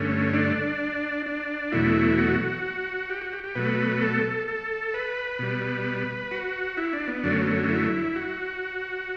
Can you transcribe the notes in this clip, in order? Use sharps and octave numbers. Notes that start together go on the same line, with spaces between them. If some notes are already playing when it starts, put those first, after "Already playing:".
Already playing: G2 D3 A3 C#4
D4
D4
E2 B2 F#3 A3 E4
F#4
G4
F#4
G4
G4
B2 F#3 A3 B4
A4
A4
B4
B2 G3
F#4
E4
D4
B3
F#2 D3 F#3 A3 D4
C#4
B3
C#4
E4
F#4